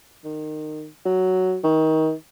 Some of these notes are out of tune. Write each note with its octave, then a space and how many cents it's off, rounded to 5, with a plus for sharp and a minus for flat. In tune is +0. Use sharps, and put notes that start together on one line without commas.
D#3 -20
F#3 +5
D#3 +25